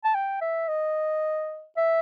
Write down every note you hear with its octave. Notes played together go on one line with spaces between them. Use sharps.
A5
G5
E5
D#5
E5